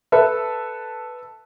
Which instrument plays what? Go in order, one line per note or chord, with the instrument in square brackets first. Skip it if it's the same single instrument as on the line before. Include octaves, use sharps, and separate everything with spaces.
[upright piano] A4 B4 E5